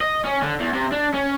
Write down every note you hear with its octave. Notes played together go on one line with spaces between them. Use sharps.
D#5
C#4
D3
E2
C3
D4
C#4